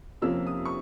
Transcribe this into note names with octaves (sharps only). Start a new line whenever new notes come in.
F2 C3 F3 A#3 C#4 E6
D#6
C#6